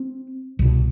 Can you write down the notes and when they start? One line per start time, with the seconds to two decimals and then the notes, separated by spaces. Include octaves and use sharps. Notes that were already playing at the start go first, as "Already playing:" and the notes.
Already playing: C4
0.59 C2 B2